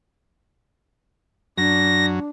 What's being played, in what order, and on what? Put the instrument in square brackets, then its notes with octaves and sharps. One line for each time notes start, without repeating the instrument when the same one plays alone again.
[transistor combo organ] F#2 F#3 [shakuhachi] D4 [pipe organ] A#6